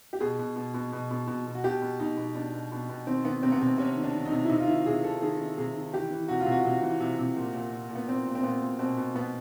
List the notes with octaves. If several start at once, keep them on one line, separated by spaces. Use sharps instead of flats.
G4
B2 G#4
B2
B2
B2
B2
B2
B2
B2
F#4
B2 G4
B2
B2 D#4
B2
B2 D4
B2
B2
B2
D#3 C4
D#3 B3
C3 C4
B3
C3 C4
C3 C#4
D#3
D4
D#3
D#4
C3
E4
C3 D#4
F4
D#3 E4
C3 G#4
D#3 A4
D#3 G#4
D#3
C3 G#4
D#3
E3 G4
E3
C3 F#4
F4
C3
F#4
C3
E3
C3
C3
A#2
A#2
A#2
A#2
B3
A#2 C4
A#2
C4
A#2 B3
A#2
B2 C4
B2
B2 B3